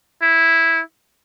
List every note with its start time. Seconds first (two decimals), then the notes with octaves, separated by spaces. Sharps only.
0.22 E4